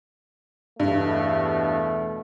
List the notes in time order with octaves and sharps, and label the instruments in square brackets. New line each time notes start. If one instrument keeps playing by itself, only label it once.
[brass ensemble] E2 B2 A3 [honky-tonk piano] G2